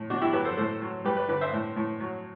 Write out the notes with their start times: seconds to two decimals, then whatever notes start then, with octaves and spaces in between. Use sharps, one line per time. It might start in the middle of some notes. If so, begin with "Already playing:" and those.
Already playing: A2
0.10 B2 D4 F#4
0.21 E4 G4
0.33 F#3 G4 B4
0.45 A4 C5
0.57 A2 A4 C5
0.82 F#3
1.05 G3 G4 B4
1.17 B4 D5
1.28 D3 B4 D5
1.41 C5 E5
1.53 A2
1.76 A2
2.00 F#3